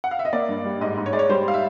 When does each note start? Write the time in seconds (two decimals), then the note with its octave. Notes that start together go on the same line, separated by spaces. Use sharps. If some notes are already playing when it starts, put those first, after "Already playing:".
0.04 F#5
0.11 F5
0.19 E5
0.25 D#5
0.33 A#3 D5
0.49 G2
0.65 G3
0.81 G#2 D#5
0.97 G#2
1.06 C#5
1.13 G#3 D5
1.19 C#5
1.29 G3 C5
1.48 F5
1.54 E5